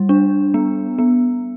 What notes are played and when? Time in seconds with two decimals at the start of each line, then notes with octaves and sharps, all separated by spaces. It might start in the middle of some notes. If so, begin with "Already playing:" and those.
Already playing: G3
0.09 D4
0.54 B3
0.99 B3